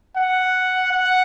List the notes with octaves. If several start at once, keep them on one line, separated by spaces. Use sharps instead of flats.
F#5
F#5